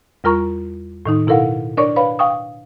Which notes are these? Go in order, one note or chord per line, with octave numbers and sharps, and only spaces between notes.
E2 G3 F4 A#4 A#5 C#6
A2 D#3 D#4
B2 E4 A4 A#4 F5 F#5
D4 A#4 C#5 D5 C#6
B4 C#5 F5 B5
F5 G5 C#6 D#6